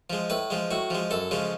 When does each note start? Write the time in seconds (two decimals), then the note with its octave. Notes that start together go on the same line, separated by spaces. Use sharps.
0.10 F3 G#3
0.30 A2 B4
0.50 F3 G#3
0.71 A2 F#4
0.90 F3 G#3
1.11 F#2 A4
1.31 C#3 F3 G#3